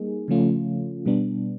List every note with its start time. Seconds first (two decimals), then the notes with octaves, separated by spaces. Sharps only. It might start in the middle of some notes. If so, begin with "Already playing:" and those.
Already playing: G3 A#3 D#4 G#4
0.28 C#3 F3 A3 C#4 F4
1.06 B2 G3 B3 D4